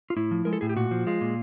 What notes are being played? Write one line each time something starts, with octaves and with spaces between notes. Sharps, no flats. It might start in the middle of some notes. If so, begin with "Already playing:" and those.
F4
A2 E4
F3
G#3 A#4
A4
A2 G#4
G4
A#2 F#4
F3
G#3 F4
A#2